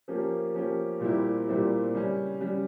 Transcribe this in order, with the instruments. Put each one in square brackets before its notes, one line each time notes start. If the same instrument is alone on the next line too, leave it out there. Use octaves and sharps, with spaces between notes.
[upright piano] F3 A#3 C#4 G4
F3 A#3 C#4 G4
A#2 G3 C4 E4 G4
A#2 G3 C4 E4 G4
C#3 G3 C#4
C#3 G3 C#4